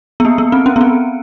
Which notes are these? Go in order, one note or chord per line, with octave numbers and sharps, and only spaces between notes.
B3
A#3
B3
C4
C#4
B3
C4